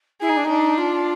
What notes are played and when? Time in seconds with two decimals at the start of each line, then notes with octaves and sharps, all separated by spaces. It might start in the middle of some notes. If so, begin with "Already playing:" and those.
0.21 E4 G#4
0.29 D#4
0.36 D4
0.44 D#4
0.49 D4
0.77 F4